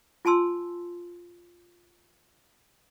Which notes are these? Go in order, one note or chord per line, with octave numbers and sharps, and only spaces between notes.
F4 G#5 A5 C6 E6